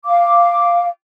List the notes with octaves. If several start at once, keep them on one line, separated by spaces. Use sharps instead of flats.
F5 D6